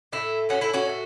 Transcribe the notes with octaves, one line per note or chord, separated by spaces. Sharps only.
A2 A3 E4
A2 A3 C#4 F#4
E4 A4
C#4 F#4
A2 A3